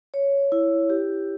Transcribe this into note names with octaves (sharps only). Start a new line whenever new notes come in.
C#5
E4
G4